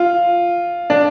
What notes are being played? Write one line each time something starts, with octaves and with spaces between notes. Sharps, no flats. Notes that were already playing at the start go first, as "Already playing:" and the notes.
Already playing: F4
D4